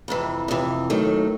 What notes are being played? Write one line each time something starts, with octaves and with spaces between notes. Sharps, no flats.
F2 C3 E3
F2 C3 E3
D#2 D#3 F#3 A3